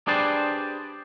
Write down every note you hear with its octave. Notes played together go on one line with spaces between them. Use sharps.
D4 G4 G#4 B4 C5 D5